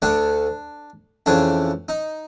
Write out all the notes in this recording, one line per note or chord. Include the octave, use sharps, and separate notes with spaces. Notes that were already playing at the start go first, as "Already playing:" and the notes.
D2 D3 D4
F2 C#3 E3 D4
D#4